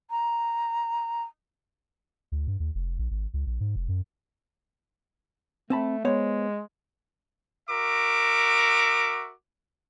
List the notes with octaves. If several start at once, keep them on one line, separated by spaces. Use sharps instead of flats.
A#5
D2
G2
D#2
F1
A#1
G#1
C#2
A#1
G#2
F1
F#2
A3 C4 A5 B5
G#3 B3 C5 C#5
F#4 A#4 E5 D6